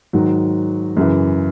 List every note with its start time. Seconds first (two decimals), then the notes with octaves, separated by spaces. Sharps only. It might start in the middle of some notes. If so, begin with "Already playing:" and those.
0.13 G#2 D#3 F#3
0.97 F#2 C#3 E3